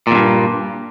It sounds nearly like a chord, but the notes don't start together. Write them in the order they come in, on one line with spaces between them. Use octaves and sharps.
A#2 E2 G2